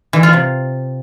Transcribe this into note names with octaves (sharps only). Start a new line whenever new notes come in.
E3
F4
C3